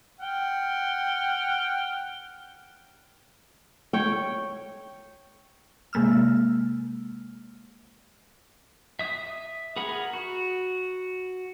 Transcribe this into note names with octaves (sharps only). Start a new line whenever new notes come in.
F#5 G5 F6
C#5 G5
C3 G#3 A#3 E6 F6
E5 D#6
G#4 A#4 F#5 B5 D#6
F#4